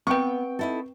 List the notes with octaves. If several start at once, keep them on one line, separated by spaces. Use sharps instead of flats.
B3 C4 B4 G5 C#6
D#4 E4 A4